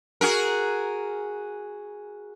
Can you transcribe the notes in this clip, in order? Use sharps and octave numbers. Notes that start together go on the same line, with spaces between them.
F#4 G#4 A#4